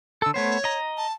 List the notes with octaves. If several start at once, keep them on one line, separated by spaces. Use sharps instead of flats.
D3 A4 E6
A3 B3 C5 C#5
D#5 A#5
A5